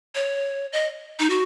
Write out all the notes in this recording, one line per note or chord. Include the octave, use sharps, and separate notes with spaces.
C#5
D#5
D#4
F#4